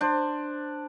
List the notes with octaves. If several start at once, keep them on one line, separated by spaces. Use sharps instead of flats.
D4 C5